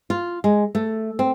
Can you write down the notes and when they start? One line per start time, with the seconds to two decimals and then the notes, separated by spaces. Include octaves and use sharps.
0.10 F4
0.44 G#3
0.75 A3
1.19 C4